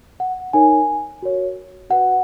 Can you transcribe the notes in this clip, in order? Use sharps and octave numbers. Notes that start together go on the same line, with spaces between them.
F#5
D#4 A#4 C#5 G#5
F#4 A#4 C#5
F#4 B4 F#5